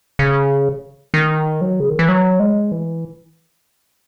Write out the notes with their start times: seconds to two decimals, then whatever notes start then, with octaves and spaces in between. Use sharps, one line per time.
0.19 C#3
1.14 D#3
1.61 F#3
1.80 C#3
1.89 D#3
1.99 E3
2.09 F#3
2.39 G#3
2.72 E3